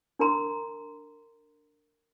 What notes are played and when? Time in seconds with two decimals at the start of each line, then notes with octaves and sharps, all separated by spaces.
0.19 D4 A#4 A#5 C6